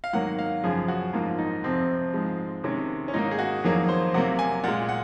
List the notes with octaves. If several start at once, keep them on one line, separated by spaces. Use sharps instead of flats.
F5
G#2 D#3 F#3 A#3 F#5
F5
F#2 C#3 F3 G#4
F#4
G#2 F3 A#3 F4
D#4
F2 C3 F3 C4
G#2 F3 G#3
C3 D#3 G#3 C#4
C#4
G#2 D#3 A#3 D#4
G#4
F#4
F2 D#3 F#3 A#3 G#4
C5
C3 F#3 A#3 F#5
G#5
A#2 G#3 F#5
F#5